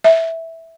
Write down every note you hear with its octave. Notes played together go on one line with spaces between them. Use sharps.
E5